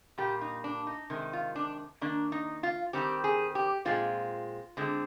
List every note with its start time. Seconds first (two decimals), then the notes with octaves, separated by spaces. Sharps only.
0.18 A#2 G3 A#3 G4
0.41 D#4
0.64 D4
0.87 D#4
1.10 C3 D#3 G#3
1.33 F4
1.56 D4
2.01 D#3 A#3 D4
2.32 D#4
2.63 F4
2.93 D#3 G3 C4 G4
3.24 G#4
3.55 G4
3.85 A#2 G#3 C4 F4
4.77 D3 G#3 C4